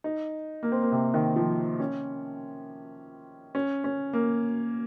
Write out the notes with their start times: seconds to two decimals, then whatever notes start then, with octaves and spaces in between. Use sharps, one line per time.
0.04 D#4
0.63 A#3
0.72 C4
0.82 A#3
0.92 C3
1.14 D#3
1.36 F3
1.80 C#4
3.55 C#4
3.84 C#4
4.13 A#3